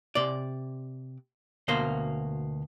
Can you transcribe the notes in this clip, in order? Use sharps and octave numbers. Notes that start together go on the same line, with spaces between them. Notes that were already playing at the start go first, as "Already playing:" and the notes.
C3 D5
D2 B2 A#3 C5